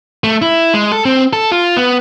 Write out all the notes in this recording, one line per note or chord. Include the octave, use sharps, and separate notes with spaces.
A3
E4
G#3
A4
C4
A4
F4
B3